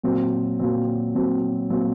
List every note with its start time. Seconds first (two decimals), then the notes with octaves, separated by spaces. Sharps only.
0.03 A#2 F#3 C4
0.59 A#2 F#3 C4
1.15 A#2 F#3 C4
1.70 A#2 F#3 C4